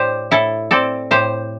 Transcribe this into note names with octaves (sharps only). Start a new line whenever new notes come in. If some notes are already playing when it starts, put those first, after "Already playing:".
Already playing: A2 G4 C5 D5
A2 E4 A4
C4 A4 D5
A2 G4 C5